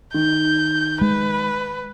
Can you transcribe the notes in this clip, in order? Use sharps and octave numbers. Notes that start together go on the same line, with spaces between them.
D#3 G6
G#3 B4